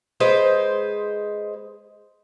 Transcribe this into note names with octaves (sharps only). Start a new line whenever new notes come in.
G#3 B4 C5